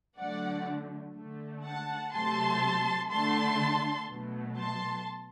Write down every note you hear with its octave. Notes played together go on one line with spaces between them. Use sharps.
D3 F#3 A3 D5 F#5
D3 A3
F#5 A5
C3 F#3 A3 A5 C6
D3 A3 A5 C6
B2 F#3 A3
A5 C6